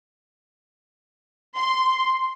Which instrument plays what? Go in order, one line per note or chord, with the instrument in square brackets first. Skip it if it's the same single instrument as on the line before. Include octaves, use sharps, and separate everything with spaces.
[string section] C6